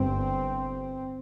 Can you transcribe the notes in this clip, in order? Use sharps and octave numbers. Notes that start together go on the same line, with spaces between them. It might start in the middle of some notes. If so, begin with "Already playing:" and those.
Already playing: G1 G2 C4